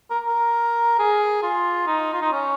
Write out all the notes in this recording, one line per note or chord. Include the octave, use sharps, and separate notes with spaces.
A#4
A#4
G#4
F4
D#4
F4
D#4
C#4